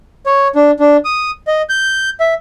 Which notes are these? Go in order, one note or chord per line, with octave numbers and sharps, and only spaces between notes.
C#5
D4
D4
D#6
D#5
G6
E5